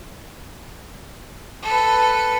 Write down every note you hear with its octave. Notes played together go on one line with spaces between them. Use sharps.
A4 B4